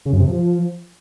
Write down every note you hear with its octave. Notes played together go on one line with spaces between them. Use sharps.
C#3
F#2
C3
F3